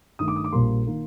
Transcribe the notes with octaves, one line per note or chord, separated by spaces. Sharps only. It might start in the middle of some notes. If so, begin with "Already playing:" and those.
G2 D#3 A3 D#6
D6
D#6
D6
A#1 A#2 G3 A#3 C6
D#3 A#3